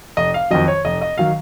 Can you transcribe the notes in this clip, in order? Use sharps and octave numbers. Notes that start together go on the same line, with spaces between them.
F1 D#5
F5
F2 D#3 F#3 D#5
C#5
F1 D#5
D#5
D#3 F#3 F5